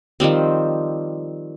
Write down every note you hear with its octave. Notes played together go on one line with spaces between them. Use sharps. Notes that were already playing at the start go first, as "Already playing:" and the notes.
D#3 F3 G3 C4